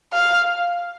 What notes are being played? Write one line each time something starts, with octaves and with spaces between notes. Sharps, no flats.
F5